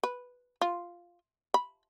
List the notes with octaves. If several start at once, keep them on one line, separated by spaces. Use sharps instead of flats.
B4
F4
B5